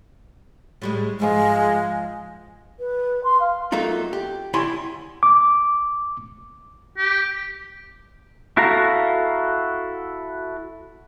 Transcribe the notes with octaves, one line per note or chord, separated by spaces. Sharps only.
A2 G3 G#3
G#2 F3 G#3 F4
B4
C6
F5
F#3 A3 A#3 D#4 F4
G4
D2 G3 E4 C#5 G#5 C6
D6
G4
E4 F#4 A4 F5 A#5